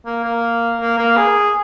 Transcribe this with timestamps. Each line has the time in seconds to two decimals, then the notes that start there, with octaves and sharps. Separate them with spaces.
0.06 A#3
0.24 A#3
0.80 A#3
0.99 A#3
1.17 G#4